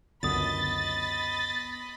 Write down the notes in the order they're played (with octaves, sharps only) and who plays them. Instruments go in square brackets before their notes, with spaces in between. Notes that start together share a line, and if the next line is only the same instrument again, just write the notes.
[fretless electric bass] C#2 F#2 D3 [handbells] B3 D#6 [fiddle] D#5 B5 [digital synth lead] A6